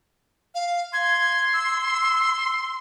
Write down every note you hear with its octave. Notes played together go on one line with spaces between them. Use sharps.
F5
C6 G#6
E6